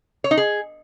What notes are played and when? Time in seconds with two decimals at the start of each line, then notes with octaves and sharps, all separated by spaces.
0.24 C#5
0.31 D#4
0.37 G#4